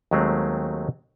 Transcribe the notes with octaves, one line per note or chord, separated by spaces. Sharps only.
D#2 D#3 F#3 G#3 A3 C4